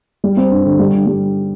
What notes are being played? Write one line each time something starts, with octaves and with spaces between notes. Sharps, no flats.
G3
C4
G2
D3
G3
D3
G3